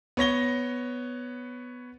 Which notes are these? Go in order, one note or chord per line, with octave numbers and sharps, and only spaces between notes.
B3 C#5 A#6 G7